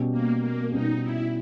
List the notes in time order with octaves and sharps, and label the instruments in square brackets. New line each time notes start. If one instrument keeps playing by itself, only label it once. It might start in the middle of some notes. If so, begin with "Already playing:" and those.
Already playing: [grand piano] B2 G3 C#4 G4
[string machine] A#3
A#3
[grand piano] B2 G3 C#4 G4 [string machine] D#4
[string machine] E4